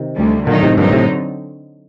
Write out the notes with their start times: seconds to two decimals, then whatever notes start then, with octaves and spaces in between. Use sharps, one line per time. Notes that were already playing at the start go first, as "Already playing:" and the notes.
Already playing: C3 D#3
0.16 D2 D3 G3
0.46 A#2 D3 D#3 F#3 A3 D#4
0.63 A2 C3
0.77 G2 A#2 D3 F#3 C4 D#4
0.93 A2 C3